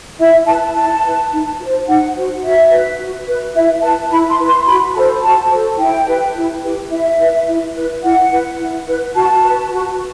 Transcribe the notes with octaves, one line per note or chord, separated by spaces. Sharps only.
E4 E5
B4 A5
E4 A5
B4
D#4
F#4
C5
D#4 F#5
F#4 C5
F#4 E5
B4
F#4
B4
E4 E5
B4 A5
E4 B5
C6
B4
C6
F#4 B5
A4 C5 A5
F#4 A5
A4 C5
E4 G5
G4 B4
E4
G4 B4
E4 E5
B4
E4
B4
E4 F#5
B4
E4
B4
F#4 A5
B4
F#4